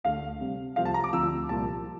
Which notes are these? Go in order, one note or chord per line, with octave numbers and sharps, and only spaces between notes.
D2 D3 A3 F5
C3 G3 C4
C2 C3 F3 A3 C4 F5
A5
A#5
D6
D2 D3 F3 C4 E6
C2 A#2 F3 A5
F3